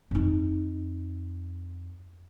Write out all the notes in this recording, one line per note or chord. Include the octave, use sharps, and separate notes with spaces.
F2 D#4